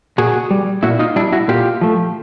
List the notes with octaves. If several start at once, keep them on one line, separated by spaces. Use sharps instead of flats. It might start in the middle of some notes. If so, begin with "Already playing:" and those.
A#2 F#4 G#4
G3
A#2 E4 F#4
D#4 F4
G3 D4 E4
E4 F#4
A#2 F4 G4
F3 A3